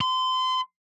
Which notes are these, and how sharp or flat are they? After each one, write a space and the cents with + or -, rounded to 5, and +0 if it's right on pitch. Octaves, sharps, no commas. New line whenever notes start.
C6 -30